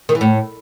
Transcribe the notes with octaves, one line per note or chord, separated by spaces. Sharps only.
D#3
E3
A2